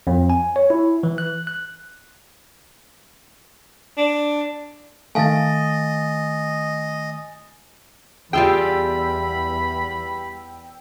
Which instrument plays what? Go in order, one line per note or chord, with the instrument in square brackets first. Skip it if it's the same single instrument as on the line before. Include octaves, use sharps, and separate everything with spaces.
[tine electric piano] F2
G#5
C#5
E4
E3
F#6
F#6
[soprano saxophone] D4
[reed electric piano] D#3 A3 [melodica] D#5 [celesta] F5 A5 [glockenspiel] G#5 A6
[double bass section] E2 [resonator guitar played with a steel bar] G3 F4 G#4 [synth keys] G5 E6 [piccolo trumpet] B5